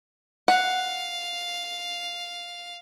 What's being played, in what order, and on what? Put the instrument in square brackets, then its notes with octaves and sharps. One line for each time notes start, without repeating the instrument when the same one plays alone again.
[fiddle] F5 [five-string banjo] F#5